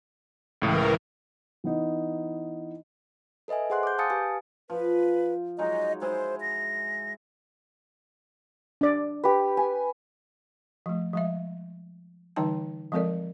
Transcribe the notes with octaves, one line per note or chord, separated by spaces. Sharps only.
C#2 A2 E3 A3 A#4
E3 B3 D#4
A4 B4 D#5 E5 G#5
G#4 C5 F#5 C6 F#6
D6 G6
F5 G#5 A5 D#6 A6 C#7
G4 B4 F5 G#5
F3 B4
F#3 G#3 D#4 D#5
G#3 E4 C5 D#5
A#6
D4 D5
G4 B4
G#5
F3 A3
F3 G#3 E5
D3 E3 G3 D#4 G5 A5
F3 G#3 C4 A4 A#4 D5